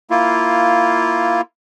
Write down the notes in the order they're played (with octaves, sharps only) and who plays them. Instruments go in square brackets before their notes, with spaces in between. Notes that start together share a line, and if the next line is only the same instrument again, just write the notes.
[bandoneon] A#3 E4 F4